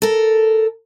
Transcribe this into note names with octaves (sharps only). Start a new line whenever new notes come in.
A4 A#4